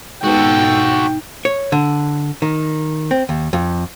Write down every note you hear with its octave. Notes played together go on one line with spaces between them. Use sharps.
G#2 B2 D#4 F#4 A4 G5
C#5
D3
D#3
C4
D#2
F2